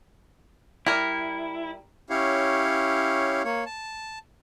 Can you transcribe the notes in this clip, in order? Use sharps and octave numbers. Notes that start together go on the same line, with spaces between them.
G3 E4 A#4
C#4 E4 G4 C#5 F5
A#3 C#5
A5